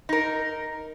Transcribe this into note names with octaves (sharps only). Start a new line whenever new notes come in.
D#4 A#4